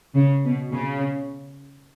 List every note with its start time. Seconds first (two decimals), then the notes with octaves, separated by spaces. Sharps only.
0.15 C#3
0.44 B2
0.72 C#3